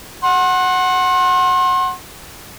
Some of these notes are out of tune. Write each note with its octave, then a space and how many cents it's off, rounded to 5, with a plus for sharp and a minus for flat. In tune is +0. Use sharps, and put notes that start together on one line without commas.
F#5 +0 C6 +40